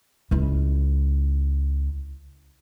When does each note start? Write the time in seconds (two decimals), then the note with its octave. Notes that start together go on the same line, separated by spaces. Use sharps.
0.31 C#2 E4